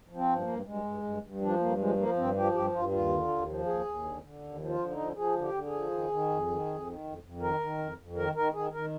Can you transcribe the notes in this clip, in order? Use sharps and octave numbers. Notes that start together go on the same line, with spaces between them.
F3
C4
G2
A#3
G2
G2 G#3
G2
G2
G2
F3 D4
G2 A#3
F3 G#3
F3 A#3
G2 C4
F3 G4
G2 G4
G2 F4
D#2 F4
D3
D#2
F3
D#2 G#4
D#2
D3
D3
D#2
F3
F4
D3
D#4
F3
F3 G#4
D3
G4
D3
G#4
F3
D#3
D#3
F2
D#3
F2
D#3
F2
F2
D#3 A#4
D#3
F2
F2
D#3 A#4
D#3 A#4
D#3 G#4
D#3 A#4